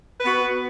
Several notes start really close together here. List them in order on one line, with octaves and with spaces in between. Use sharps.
B4 B3 F#4